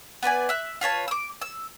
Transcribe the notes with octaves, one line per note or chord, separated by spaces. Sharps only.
B3 B4 D5 G#5
E5 F#6
F4 B4 C#5 A5
D6 E6
E6